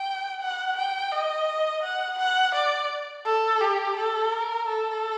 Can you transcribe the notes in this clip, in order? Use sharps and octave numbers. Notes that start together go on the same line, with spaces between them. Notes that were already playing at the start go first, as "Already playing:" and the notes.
Already playing: G5
F#5
G5
D#5
F#5
F#5
D5
A4
G4
A4
A#4
A4